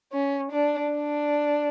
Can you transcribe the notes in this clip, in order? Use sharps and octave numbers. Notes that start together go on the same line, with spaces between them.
C#4
D4
D4